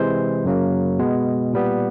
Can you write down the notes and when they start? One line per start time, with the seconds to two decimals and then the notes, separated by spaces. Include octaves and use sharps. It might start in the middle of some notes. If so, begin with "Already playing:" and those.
Already playing: C3 E3 G#3 C5
0.45 F#2 C#3 F#3 A#3
0.99 B2 G#3 B3
1.53 A#2 G3 B3